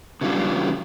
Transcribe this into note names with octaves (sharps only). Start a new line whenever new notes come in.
C#3 E3 F#3 G3 D4 F4